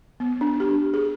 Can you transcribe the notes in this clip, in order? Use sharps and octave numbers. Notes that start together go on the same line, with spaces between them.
B3
D4
G4
G#4